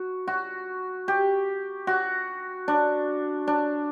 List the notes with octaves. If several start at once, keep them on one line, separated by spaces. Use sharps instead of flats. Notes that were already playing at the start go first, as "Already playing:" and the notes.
Already playing: F#4
F#4
G4
F#4
D4
D4